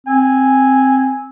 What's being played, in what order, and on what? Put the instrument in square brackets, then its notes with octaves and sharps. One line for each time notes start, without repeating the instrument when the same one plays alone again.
[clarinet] C4 [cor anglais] G#5